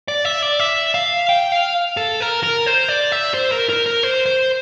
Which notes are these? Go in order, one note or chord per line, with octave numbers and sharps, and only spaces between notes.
D5
E5
D5
E5
F5
G5
F5
A4
A#4
A#4
C5
D5
E5
C5
A#4
A#4
A#4
C5
C5